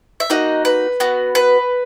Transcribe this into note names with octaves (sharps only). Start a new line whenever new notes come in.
E5
A#3 D#4 F#4 D#5
B4
B3 F#4
B4